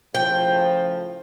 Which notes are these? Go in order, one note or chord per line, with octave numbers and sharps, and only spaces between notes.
A2 C#3 F3 G5